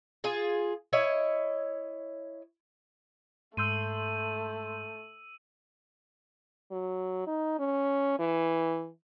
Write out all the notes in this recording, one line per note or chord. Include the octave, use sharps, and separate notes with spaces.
F4 G#4
E4 C#5 D#5
G#2 A3 C6 E6 G6 D#7
F#3
D#4
C#4
E3